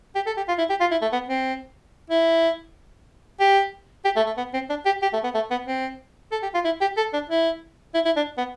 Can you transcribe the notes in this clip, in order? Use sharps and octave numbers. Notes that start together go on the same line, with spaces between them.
G4
A4
G4
F4
E4
G4
F4
E4
A3
B3
C4
E4
G4
G4
A3
A3
B3
C4
D4
G4
G4
A3
B3
A3
B3
C4
A4
G4
F4
E4
G4
A4
D4
E4
E4
E4
D4
B3